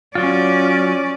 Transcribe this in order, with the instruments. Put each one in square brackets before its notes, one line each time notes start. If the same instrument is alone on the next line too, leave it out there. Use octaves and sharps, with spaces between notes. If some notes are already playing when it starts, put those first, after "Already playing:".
[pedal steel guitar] F#3 F4 [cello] C#4 D5